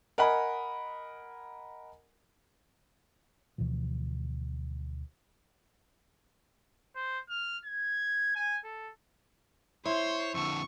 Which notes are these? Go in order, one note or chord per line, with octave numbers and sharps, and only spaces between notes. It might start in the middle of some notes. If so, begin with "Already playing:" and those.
A#4 D#5 F#5 G#5 B5
D2 B2 E3 F3
C5
F6
G#6
G#5
A4
E4 C5 C#5 C6
F2 D3 C#6